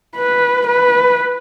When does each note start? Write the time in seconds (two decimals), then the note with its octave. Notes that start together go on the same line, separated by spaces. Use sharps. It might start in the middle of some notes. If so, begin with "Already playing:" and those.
0.16 B4
0.67 B4